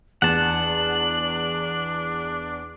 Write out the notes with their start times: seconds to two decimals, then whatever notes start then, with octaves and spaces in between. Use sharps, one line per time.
0.22 E2 D4 F#5 A5 F#7